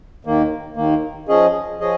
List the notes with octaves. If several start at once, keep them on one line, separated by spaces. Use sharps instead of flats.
D#2 D#3 A#3
D#2 D#3 A#3
F3 C#4 G#4 D#5
F3 C#4 G#4 D#5